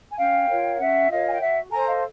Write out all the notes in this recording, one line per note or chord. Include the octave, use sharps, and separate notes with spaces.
G#5
C#4 F5 G5
F4 A#4 C#5
G5
C#4 E5 F#5
F4 A#4 C#5 D#5 F5
G#5
G5
F#4 E5 F#5
A4 C5 G#5 A#5
D#5 F5